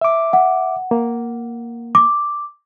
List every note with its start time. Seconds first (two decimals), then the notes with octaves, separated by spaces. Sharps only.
0.01 E5 D6
0.33 F#5
0.91 A#3
1.95 D6